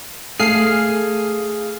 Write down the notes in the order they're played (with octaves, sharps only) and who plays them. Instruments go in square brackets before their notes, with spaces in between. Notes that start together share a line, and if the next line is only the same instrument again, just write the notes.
[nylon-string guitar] A3 [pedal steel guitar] G#4 F5 G#5 [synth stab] C7